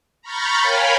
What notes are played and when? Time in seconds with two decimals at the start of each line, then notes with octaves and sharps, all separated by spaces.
0.22 A#5 B5 C#6 F6 G6 A6
0.60 A#4 C#5 F5 G5 G#5 B5